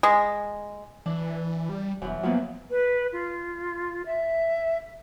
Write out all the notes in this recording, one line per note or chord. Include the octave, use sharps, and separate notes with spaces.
G#3
E3 D4
G3
E1 F#2 E3
F3 F#3 A#3 B3
B4
F4
E5